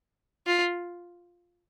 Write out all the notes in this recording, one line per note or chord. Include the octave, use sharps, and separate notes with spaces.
F4